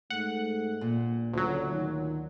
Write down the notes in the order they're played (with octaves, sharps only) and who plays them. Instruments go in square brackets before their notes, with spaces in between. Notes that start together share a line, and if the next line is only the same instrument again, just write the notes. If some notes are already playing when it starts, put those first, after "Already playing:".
[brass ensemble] G#2 A3 [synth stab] F#5
[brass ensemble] A#1 [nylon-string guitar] A#2
[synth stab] D2 F#3 [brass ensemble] C#3 F4
[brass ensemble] D#3